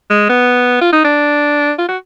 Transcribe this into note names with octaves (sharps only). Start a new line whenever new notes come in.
G#3
B3
F4
D#4
D4
F4
F#4